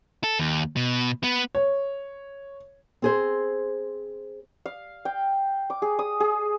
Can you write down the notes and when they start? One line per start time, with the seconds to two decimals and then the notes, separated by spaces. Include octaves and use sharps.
0.24 A4
0.39 D#2
0.76 B2
1.23 B3
1.55 C#5
3.02 C4 G#4 C5
4.66 F5
5.05 G5
5.70 D6
5.82 G#4
5.99 D#6
6.20 G#4